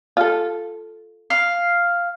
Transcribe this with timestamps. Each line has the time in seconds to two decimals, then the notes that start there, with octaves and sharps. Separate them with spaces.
0.17 F4 A4
1.30 F5